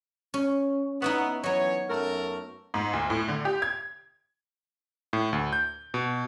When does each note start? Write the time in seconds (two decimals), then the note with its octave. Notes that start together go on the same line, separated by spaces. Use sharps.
0.34 C#4
1.02 B3 D#4 E4 F#4
1.43 E3 F#3 B3 C#4 C#5
1.90 F#2 A3 A#4
2.74 G#2
2.93 D2
3.10 A2
3.28 D3
3.45 G4
3.62 G#6
5.13 A2
5.33 D2
5.53 G6
5.94 B2